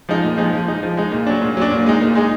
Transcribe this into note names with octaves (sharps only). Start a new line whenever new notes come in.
F3 G#3 D#4
A#2
F3 G#3 D#4
F3
G#3 D#4
F3
G#3 D#4
A#2
F#3 D4
A#2
F#3 D4
A#2
G#3 D#4
A#2
G#3 D#4